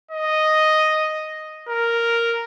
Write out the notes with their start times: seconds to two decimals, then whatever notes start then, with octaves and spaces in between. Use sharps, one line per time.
0.11 D#5
1.69 A#4